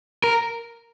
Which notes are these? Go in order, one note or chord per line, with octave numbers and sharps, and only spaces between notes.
A#4